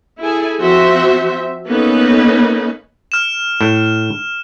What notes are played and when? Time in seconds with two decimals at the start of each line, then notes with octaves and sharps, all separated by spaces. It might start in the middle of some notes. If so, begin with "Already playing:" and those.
0.20 E4 G#4 A4 G#5
0.61 F3 C4 F#4 C5 E5
1.68 A#3 B3 C#4 D#4 A4 B4
3.12 F6 E7
3.61 A2